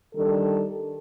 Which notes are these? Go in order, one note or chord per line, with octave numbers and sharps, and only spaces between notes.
D#3 G3 D4 A4